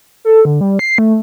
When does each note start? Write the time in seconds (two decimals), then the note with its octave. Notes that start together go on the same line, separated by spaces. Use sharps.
0.25 A4
0.45 D3
0.61 G3
0.79 C7
0.98 A3